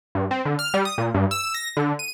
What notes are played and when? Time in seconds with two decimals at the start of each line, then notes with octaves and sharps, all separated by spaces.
0.15 G2
0.31 C4
0.45 D3
0.59 F6
0.74 G3
0.85 D#6
0.98 A#2
1.14 G2
1.31 E6
1.54 A#6
1.77 D3
1.99 D#7